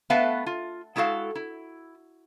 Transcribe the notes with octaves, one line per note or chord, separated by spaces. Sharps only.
A3 B3 B4 E5 F5 A5
F4
G#3 E4 F#4 A4 F5
E4